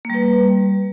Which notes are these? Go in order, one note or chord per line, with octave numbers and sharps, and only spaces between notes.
G3 A#3 B4